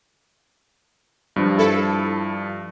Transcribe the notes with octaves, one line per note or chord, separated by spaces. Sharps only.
G2 F3
E4 A4